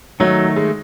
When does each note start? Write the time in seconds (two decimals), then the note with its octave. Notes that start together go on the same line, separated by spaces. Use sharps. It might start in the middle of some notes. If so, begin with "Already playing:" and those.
0.20 D#3 F#3 A3 D#4
0.56 G#3